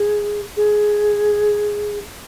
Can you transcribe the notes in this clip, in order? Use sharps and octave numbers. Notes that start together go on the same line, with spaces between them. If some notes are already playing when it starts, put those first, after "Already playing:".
Already playing: G#4
G#4